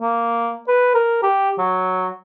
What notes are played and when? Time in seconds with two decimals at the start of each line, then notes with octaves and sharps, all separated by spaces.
0.01 A#3
0.68 B4
0.94 A#4
1.23 G4
1.58 F#3